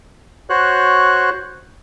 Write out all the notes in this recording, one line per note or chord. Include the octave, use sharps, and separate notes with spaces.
F#4 C5 C#5 F#6